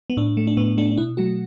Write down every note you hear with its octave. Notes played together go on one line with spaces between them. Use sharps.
B3
A2 D4
A3
D4
A2 B3
A3 D4
D4
B2 E4
F#3 A3 F#4